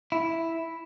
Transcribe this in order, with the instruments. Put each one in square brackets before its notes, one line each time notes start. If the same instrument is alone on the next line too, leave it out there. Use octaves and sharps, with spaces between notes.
[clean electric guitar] E4